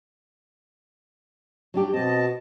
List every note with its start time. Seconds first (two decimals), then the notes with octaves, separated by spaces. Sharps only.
1.74 F#3 D4 G4
1.94 B2 C4 D#5 A5